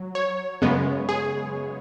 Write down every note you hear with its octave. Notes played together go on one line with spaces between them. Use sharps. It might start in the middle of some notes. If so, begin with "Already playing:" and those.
Already playing: F#3
C#5
F#2 C#3 G#3 B3
G#4